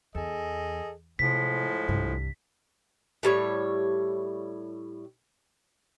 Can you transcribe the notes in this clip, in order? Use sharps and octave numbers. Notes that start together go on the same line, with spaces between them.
E2 G#4 A4 D#5
A2 C3 F3 G#3 B6
C2 G2
A2 G3 C#5